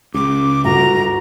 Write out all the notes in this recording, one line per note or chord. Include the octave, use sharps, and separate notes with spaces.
C#2 C#3 D6
G1 F#4 A#5